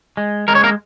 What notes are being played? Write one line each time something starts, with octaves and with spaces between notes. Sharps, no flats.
G#3
G#3 A#4
C#5
A#3 A#4